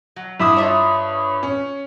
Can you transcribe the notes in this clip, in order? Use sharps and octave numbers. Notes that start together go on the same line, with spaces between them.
F#3
G2 E4 D6 D#6
F4 C#5 E5 A#5
C#4